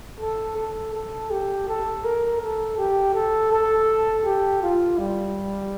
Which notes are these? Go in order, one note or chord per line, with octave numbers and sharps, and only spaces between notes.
A4
A4
A4
G4
A4
A#4
A4
G4
A4
A4
G4
F4
G3